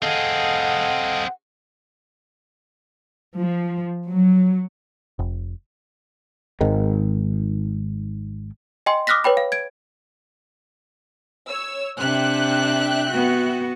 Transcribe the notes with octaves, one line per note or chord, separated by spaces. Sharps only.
C4 G#4 A4 D#5 F5 F#5
F3
F#3
F1
G#1 G#2 D#3
D#5 G5 G#5 C6
D6 D#6 F6 F#6 A#6 B6
B4 C#5 G5 B5
F5
G#6 D7
C#5 E6
C3 D4 E5 G5 F#6
B3 F#4